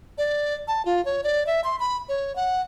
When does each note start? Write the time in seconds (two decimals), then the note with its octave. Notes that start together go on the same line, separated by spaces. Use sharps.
0.18 D5
0.68 A5
0.85 F4
1.05 C#5
1.24 D5
1.47 E5
1.64 C6
1.80 B5
2.09 C#5
2.36 F#5